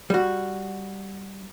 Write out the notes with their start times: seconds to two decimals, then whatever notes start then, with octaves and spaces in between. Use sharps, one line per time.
0.10 G3 F#4